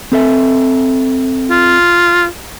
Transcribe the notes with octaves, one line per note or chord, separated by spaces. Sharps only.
C4 A4 E5
F4